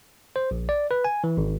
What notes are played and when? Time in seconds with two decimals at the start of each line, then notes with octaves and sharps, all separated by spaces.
0.36 C5
0.51 A#1
0.69 D5
0.91 B4
1.04 G#5
1.24 E3
1.37 G#1